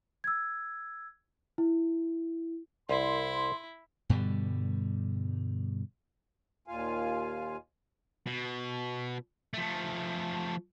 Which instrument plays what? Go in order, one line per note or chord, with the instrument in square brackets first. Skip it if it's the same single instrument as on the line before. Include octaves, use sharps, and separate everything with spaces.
[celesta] E6 G#6
E4
[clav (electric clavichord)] C2 [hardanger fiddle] E4 [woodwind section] C6
[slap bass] G2 B2 D3 G3
[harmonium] D#2 A#2 F4 F5 G#5
[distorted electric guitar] B2
F3 A3